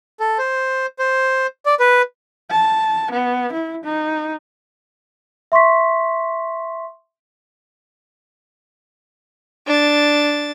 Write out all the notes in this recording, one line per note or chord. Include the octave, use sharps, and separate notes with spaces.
A4
C5
C5
D5
B4
A5
B3
E4
D#4
E5 C6 C#6 B6
D4 A6